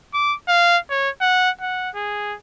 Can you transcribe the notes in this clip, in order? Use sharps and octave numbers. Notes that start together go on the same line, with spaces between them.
D6
F5
C#5
F#5
F#5
G#4